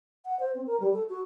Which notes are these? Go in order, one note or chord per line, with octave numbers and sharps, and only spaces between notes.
F#5
C5
C4
A#4
G3
A4
F#4